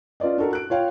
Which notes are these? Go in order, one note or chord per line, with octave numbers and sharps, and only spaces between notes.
C#4 F4 B4 D5 D#5
D4 F#4 A4 A#4
F#6 D7
F4 C#5 F5 G5